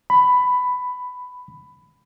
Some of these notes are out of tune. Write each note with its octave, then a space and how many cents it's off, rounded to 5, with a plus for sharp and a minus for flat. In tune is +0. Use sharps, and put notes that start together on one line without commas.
B5 +10